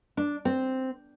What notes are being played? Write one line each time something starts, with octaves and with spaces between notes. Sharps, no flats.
D4
C4